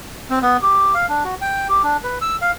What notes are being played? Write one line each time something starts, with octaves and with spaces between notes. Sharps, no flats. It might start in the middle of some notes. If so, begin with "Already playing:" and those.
C4
B3
G4
F5
D4
F#4
G5
G4
D4
B4
E6
F5